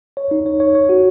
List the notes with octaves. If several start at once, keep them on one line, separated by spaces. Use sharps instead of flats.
C#5
D#4
C#5
C#5
C#5
F#4